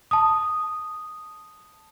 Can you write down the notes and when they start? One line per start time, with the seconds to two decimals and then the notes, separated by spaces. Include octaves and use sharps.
0.11 A5 D#6